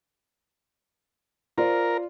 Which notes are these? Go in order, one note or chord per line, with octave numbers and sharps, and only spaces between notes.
F4 A#4 C5 D5